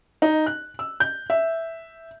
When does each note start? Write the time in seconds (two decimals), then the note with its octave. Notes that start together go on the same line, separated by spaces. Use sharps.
0.22 D#4
0.46 F#6
0.79 E6
1.00 G6
1.30 E5